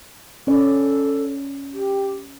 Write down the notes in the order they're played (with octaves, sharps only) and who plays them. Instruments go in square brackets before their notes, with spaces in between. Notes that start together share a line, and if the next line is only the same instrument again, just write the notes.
[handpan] C#4 D5 [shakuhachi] A4
[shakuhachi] G4